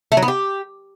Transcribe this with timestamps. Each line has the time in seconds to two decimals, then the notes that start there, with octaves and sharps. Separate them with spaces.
0.12 A3
0.17 F#3
0.23 B3
0.28 G4